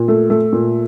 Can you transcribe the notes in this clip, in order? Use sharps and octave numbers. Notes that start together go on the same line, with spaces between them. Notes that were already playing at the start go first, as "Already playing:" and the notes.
Already playing: A#2
A3
A3
A#2